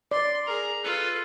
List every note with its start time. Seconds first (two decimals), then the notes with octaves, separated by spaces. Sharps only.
0.11 D5 C6
0.46 G#4 A#4 A#5
0.84 F4 A4 B4